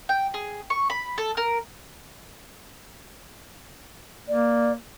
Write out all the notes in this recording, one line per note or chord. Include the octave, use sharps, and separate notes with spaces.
G5
G#4
C#6
B5
A4
A#4
A#3 D5